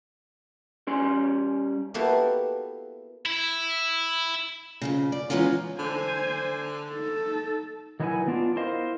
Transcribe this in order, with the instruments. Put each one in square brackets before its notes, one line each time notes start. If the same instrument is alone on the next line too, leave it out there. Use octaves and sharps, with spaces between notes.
[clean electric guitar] G3 C#4 C6
[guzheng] A#3 B3 E4 F#4 G4 A4
[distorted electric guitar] E4
[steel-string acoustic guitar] F2 A#2 C#3
D5
E3 G#3 B3 C#4 D#4 F4
[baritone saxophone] D3 [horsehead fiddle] C5 G#5
[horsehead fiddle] D#4 A4
[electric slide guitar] D#3 F#3 D#4 E4 B4 G#5
B3 D4 F4
E4 A#4 C5 D#5 F5